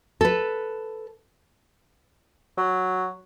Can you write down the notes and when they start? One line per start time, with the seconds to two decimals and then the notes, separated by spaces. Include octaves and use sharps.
0.21 A4 B4
2.57 F#3